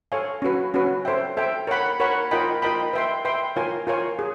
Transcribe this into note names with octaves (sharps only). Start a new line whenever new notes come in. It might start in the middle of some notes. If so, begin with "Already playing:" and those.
A4 C#5 F5 G#5
C#4 F#4 B4
C#4 F#4 B4
A4 C5 E5 G5
A4 C5 E5 G5
A#4 C#5 F#5 B5
A#4 C#5 F#5 B5
F4 A#4 D#5 G5 B5
F4 A#4 D#5 G5 B5
B4 E5 G5 C6
B4 E5 G5 C6
F4 A#4 C#5 F5 G#5
F4 A#4 C#5 F5 G#5
G#4